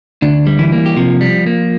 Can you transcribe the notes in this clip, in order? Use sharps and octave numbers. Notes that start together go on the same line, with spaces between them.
D2 D4
G3
E3 E4
A#3
G4
C3 F3 F4
G3
A#3